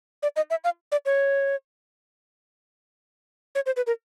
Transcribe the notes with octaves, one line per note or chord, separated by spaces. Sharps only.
D5
D#5
E5
F5
D5
C#5
C#5
C5
B4
A#4